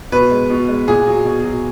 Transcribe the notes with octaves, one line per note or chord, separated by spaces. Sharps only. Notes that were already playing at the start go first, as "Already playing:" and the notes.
B2 B4
G#3
B2
G#3
A#2 G#4
F#3
B2
F#3